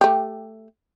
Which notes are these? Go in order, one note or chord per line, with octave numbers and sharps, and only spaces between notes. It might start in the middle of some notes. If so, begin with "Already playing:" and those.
A3 G4